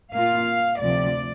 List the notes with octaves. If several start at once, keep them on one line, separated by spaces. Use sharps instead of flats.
A#2 A#3 F4 F5
D2 C3 F3 D5